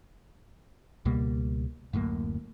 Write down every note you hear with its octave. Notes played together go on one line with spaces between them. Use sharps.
C#2 B2 G3 A#3
D1 F#2 A2 A#3